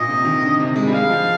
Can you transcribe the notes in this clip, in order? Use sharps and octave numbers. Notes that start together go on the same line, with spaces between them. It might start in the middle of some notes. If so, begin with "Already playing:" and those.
Already playing: A#2 D#5
C3
D#3
D3
C3
G#3
G3
G#3 F5
F3